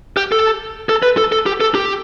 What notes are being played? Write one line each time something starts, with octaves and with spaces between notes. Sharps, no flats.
G4
A4
A4
B4
A4
A4
G4
A4
G4